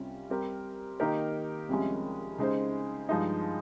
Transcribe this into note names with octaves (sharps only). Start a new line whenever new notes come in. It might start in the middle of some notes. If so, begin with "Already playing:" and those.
Already playing: C2 C3 G3 C#4 F4
G3 C4 G4 A#4
D#3 A#3 D#4 G4 A#4
C2 C3 F3 G#3 C#4
C#3 G#3 D#4 G#4 C5
G2 F3 G#3 D#4